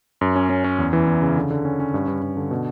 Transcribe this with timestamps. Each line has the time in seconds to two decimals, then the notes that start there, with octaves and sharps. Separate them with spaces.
0.21 F#2
0.36 C#4
0.49 C#4
0.64 C#4
0.79 E2
0.93 E3
1.07 E2
1.22 C#3
1.36 D3
1.50 D3
1.65 C#4
1.80 C#4
1.94 G2
2.08 G2
2.22 G2
2.37 D3
2.51 B2